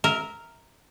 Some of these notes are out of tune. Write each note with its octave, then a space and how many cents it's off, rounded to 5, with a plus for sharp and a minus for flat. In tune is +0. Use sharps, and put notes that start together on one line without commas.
A#4 -5 E5 -20